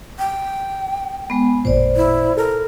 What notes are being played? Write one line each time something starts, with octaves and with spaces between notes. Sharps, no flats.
G5
G#3 B3
A1 F2 A#2 C5 D5
E4
A4 A#4